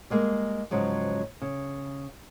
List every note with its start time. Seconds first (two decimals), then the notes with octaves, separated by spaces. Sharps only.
0.10 G3 G#3 A#3 G#4
0.71 G#2 C#3 F3 F#3 G#3
1.42 C#3